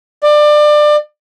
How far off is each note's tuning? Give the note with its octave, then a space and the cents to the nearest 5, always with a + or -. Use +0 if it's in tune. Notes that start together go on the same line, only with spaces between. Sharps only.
D5 +25